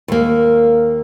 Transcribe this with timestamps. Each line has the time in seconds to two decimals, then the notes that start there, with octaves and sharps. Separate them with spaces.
0.08 D#2 A#3